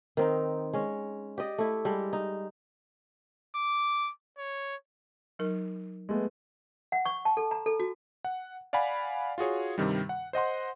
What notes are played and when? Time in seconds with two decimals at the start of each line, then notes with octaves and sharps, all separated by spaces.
0.17 D#3 C4 D#4
0.73 G#3 C#4
1.38 G4 D5 D#5
1.58 A3 E4
1.85 G3 G#3 D4
2.13 D#4
3.56 D6
4.38 C#5
5.39 F#3 D#4 A#4
6.09 G#3 A3 B3
6.92 F#5
7.05 C#6
7.25 A5
7.37 A4
7.51 A#5
7.66 A4
7.80 F#4
8.25 F#5
8.73 D5 F5 F#5 G#5 B5
9.38 F4 F#4 G#4 C#5
9.78 G2 C3 D#3 G3
10.09 F#5
10.33 C5 D#5 F#5 C6